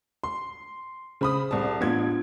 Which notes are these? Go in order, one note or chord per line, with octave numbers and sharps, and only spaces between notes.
C6
C#3 G#4 C5 B5 D#6
C2 A5
A1 B3 D4 F4 G#6